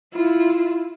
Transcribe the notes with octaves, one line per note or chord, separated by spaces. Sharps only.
E4 F4